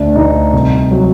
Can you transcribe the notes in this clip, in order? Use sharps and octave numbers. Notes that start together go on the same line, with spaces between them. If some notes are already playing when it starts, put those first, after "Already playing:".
Already playing: D2 D4
D2 D#4
C2
F#3